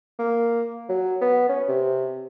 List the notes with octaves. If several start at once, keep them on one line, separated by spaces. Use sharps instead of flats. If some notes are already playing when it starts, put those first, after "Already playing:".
A#3
F#3
B3
C#4
C3